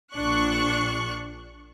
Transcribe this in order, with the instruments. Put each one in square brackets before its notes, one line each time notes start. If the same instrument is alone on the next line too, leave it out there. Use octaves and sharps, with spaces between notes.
[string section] A#1 D4 C#6 F#6